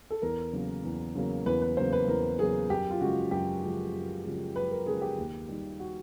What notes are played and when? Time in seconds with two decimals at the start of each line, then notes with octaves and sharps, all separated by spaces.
0.11 A4
0.22 E2 A#4
0.53 C#3 F#3 A#3
0.84 E2
1.15 C#3 F#3 A#3
1.46 E2 B4
1.62 B4
1.77 C#3 F#3 A#3 C5
1.93 B4
2.08 E2 A#4
2.39 C#3 F#3 A#3 G#4
2.70 F#2 G4
2.90 F4
3.01 C#3 F3 G#3 F#4
3.31 F#2 G4
3.63 C#3 F3 G#3
3.93 F#2
4.25 C#3 F3 G#3
4.56 F#2 B4
4.71 A#4
4.86 C#3 F3 G#3 G#4
5.02 G4
5.18 D#2
5.48 D#3 G3 A#3
5.79 F#4